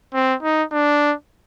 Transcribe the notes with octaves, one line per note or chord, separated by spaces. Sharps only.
C4
D#4
D4